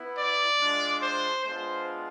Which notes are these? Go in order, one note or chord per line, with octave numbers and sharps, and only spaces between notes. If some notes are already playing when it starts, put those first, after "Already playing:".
Already playing: B3 E4
D5
G#3 D4 F4
C5
G#3 B3 D4 F4 C5